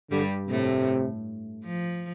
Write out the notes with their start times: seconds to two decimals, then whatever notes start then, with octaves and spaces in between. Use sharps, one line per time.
0.11 G2 D3 G3
0.49 A2 C3 A3
1.65 F3